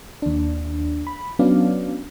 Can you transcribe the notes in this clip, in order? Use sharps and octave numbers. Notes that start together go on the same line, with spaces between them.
D#2 D4
B5
F#3 B3 C#4 D4 D5 F5